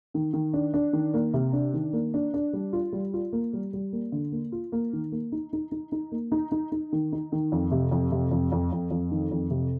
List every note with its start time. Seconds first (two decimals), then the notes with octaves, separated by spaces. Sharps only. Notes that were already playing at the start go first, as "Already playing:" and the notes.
0.14 D#3
0.33 D#3
0.53 D4
0.74 D4
0.93 D#3
1.14 A#3
1.34 C3
1.53 D4
1.73 D#3
1.93 A#3
2.14 D4
2.34 D4
2.53 G3
2.73 F4
2.92 G3
3.14 F4
3.33 A#3
3.53 G3
3.73 G3
3.93 A#3
4.12 D3
4.32 A#3
4.52 F4
4.72 A#3
4.93 D#3
5.12 A#3
5.32 D#4
5.53 D#4
5.72 D#4
5.92 D#4
6.12 A#3
6.32 D#4
6.52 D#4
6.72 D#4
6.92 D#3
7.12 D#4
7.32 D#3
7.52 F2
7.71 C3
7.91 F2
8.12 C3
8.31 F2
8.52 F2
8.72 F2
8.91 F2
9.11 D#3
9.31 F2
9.50 C3